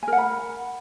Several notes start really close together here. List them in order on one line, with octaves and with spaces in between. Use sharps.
G#5 A#4 F#5 B5